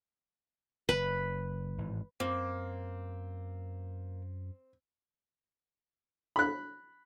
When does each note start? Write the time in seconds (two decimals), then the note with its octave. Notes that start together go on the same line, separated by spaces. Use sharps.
0.89 F#1 B4
1.78 G#1 A2 E3
2.20 F#2 A#3 C4
6.36 B5 F#6